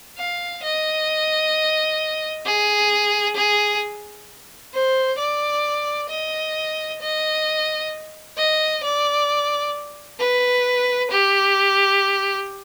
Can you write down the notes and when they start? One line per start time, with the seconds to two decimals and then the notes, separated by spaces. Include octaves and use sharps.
0.18 F5
0.63 D#5
2.45 G#4
3.36 G#4
4.73 C5
5.18 D5
6.09 D#5
7.01 D#5
8.37 D#5
8.83 D5
10.20 B4
11.11 G4